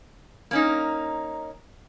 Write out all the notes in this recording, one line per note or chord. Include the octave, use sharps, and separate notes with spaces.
A#3 C#4 D#4